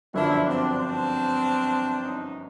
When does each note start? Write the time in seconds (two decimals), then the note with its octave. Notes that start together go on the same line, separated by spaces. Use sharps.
0.14 G1 F#2 D3 F3 D4 E4
0.45 C4 D4
0.77 C4 D4
2.04 C#4 D#4